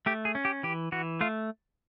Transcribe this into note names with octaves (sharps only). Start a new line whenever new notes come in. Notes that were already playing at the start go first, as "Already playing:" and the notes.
A3 G4
G#4
C#4
G4
E3 G4
E3 F#4
A3 F4